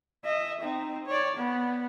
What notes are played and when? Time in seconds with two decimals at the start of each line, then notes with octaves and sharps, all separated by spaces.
0.24 D#5 E5
0.61 C4 D#4
1.07 C#5 D5
1.37 B3